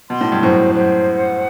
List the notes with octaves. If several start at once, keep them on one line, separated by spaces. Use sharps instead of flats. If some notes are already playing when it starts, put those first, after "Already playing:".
B2 C6
A2
G2
F#2 A2 C5
F#2 C5
F#5